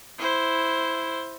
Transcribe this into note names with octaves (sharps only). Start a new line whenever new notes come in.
E4 C5